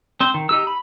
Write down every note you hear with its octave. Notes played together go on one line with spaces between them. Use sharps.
C4 C5
D#3
D#4 G4 E6
B5